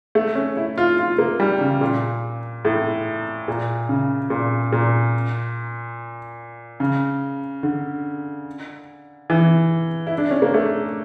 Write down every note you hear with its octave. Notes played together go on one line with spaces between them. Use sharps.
A3
C#4
E4
F4
F4
A#3
G3
C#3
A#2
A2
A#2
C#3
A#2
A#2
C#3
D3
E3
E4
D4
C#4
A#3
A3